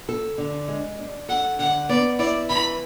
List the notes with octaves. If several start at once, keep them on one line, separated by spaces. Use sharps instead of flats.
A4
D3
G#3
D4
A4 F#5
D3 F#5
B3 D5
E4 D5
E3 B5